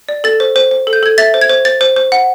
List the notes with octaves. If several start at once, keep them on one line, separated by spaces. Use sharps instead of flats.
D5
A4 A6
C5
C5
C5
A4
G6
A4 G#6
E5 A6
C5
G#6
C5
C5 A6
C5
C5
F#5